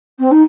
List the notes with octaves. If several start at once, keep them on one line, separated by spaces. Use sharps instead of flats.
C4
D#4